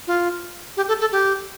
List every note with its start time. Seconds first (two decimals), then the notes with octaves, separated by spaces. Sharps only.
0.07 F4
0.77 G4
0.88 A4
1.01 A4
1.12 G4